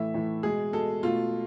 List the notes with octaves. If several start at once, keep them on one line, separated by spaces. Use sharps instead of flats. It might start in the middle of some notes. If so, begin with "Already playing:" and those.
Already playing: A2 E3 A3 E5
A2 E3 A3
B2 G#3 G#4
B2 G#3 A4
B2 A3 F4